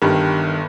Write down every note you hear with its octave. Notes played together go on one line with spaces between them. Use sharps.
G1 G2 D#3